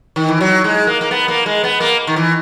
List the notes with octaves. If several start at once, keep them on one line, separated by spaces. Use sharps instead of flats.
D#3
E3
F#3
G#3
A#3
A#3
B3
A#3
G#3
B3
A#3
D#3
E3